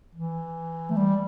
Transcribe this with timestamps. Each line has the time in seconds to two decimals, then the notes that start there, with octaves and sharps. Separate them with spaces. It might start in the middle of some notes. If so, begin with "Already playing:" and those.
0.15 E3
0.90 A3
0.97 G3